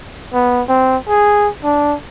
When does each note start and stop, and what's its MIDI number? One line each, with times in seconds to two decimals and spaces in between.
0.33 0.62 59
0.68 0.97 60
1.08 1.49 68
1.64 1.95 62